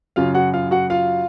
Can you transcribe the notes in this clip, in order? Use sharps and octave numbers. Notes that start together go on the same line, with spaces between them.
F#2 C#3 F#3 F4 F5
F#4 F#5
F4 F5
F#4 F#5
F4 F5